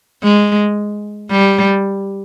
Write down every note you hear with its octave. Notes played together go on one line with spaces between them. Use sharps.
G#3
G3